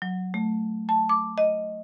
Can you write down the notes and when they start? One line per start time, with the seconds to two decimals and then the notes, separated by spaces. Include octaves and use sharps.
0.02 F#3
0.34 A3
0.89 A5
1.09 D6
1.38 D#5